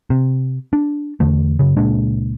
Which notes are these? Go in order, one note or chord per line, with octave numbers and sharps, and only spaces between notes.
C3
D4
E2 D3 A3
F#2 C#3
C#2 A#2 G#3 D4